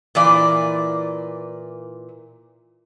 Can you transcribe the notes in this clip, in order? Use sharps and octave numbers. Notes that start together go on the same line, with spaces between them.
A#2 E3 D5